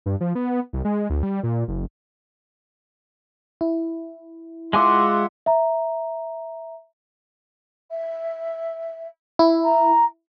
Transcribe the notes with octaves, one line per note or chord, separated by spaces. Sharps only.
G2
F3
B3
C2
G#3
D2
G3
A#2
F#1
E4
G#3 F4 E5 F#5 G#5 C6 D6
E5 A#5
E5
E4
A#5